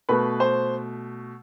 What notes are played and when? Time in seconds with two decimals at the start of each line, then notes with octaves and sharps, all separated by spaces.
0.09 B2 A3 B4
0.40 C5